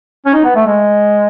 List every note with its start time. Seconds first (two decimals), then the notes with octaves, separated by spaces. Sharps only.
0.26 C#4
0.34 D#4
0.45 B3
0.55 A3
0.66 G#3